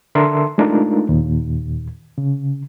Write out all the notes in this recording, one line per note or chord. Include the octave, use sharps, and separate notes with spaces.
D3 D4 A4 A#4 E5 C6
G#3 A3 D4 D#4 F4 A#4
D#2 A#2
C#3